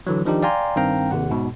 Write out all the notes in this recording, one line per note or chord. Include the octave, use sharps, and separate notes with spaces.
D3 E3 F#3
D#3 F3 D4 D#4 G4
D5 F5 G5 G#5 A#5 C6
G2 D#3 C4 F5 G5 A#5
G#1 D#2 C3 F#5
G#2 B2